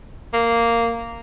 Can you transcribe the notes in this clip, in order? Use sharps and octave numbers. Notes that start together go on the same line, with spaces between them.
A#3